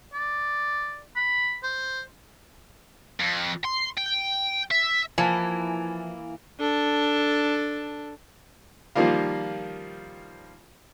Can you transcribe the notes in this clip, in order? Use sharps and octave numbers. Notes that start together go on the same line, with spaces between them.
D5
B5
C5
F2
C6
G5
E5
E3 F3 A#3 G#5 A5
D4 A4
D#3 F3 G3 A#3 F4